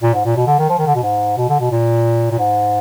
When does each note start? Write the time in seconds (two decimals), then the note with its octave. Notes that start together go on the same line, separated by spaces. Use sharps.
0.02 A#2
0.14 G#2
0.25 A#2
0.36 B2
0.47 D3
0.59 D#3
0.69 F3
0.79 D#3
0.86 D3
0.95 B2
1.03 G#2
1.37 B2
1.49 D3
1.60 B2
1.71 A#2
2.32 A#2
2.38 G#2